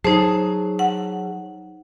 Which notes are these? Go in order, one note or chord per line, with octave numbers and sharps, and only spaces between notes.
F#3 D#4 G#4 C5 A5
F#5